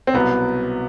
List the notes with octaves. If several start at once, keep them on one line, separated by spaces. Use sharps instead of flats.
C4
C2 B2 F#3 B3